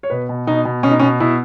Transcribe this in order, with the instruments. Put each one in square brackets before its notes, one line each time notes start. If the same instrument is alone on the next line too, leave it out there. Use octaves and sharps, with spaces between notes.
[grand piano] C#5
B2 B4
B2
B2 D#4
B2
B2 C#4
D#4
C#4
B2
B2 E4